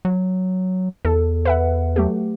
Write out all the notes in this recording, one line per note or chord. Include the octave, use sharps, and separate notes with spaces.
F#3
E2 A4
B4 E5 F#5
F#3 A3 G4